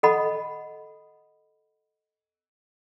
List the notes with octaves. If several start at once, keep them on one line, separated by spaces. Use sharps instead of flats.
A4 D#5 F#5 B5